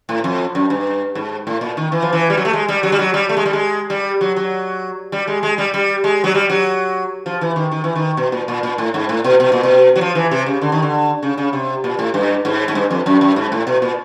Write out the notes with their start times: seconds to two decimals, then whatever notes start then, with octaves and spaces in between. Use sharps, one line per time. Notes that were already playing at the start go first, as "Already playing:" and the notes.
0.09 A2
0.24 F2
0.55 F#2
0.70 G2
1.15 G#2
1.47 A2
1.61 A#2
1.77 D#3
1.92 E3
2.02 F3
2.13 E3
2.30 G3
2.37 F#3
2.45 A3
2.53 G#3
2.69 G3
2.83 F#3
2.92 G3
2.99 F#3
3.14 G3
3.29 A3
3.37 G#3
3.46 G3
3.53 G#3
3.90 G3
4.21 F#3
4.36 F#3
5.12 G3
5.28 G#3
5.43 G#3
5.58 G3
5.74 G3
6.04 G#3
6.24 F#3
6.35 G3
6.50 F#3
7.26 F3
7.41 E3
7.56 D#3
7.72 D#3
7.84 E3
7.96 D#3
8.17 B2
8.32 A#2
8.48 A#2
8.63 A#2
8.78 A2
8.94 G#2
9.09 A2
9.24 B2
9.40 B2
9.52 A#2
9.63 B2
9.96 F#3
10.01 F3
10.15 E3
10.31 C3
10.46 C#3
10.61 D3
10.72 D#3
10.82 D3
11.23 C#3
11.38 C#3
11.53 C3
11.84 A#2
11.99 A2
12.14 G2
12.45 G#2
12.68 G#2
12.75 G2
12.91 F2
13.06 F#2
13.21 F#2
13.36 G#2
13.52 A2
13.67 B2
13.82 A#2